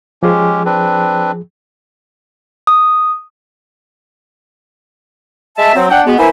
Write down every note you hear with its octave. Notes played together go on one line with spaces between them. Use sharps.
F3 G#3 C#4 G4 G#4
C4 D4 B4
D#6
G#3 E5 A5
F#3 C4
D4 F#5 G5
G#3 B3 F#4
A#3 B3 E4 C5 E5 G#5